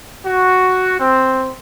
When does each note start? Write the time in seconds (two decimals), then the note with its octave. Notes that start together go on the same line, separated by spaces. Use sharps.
0.25 F#4
0.98 C4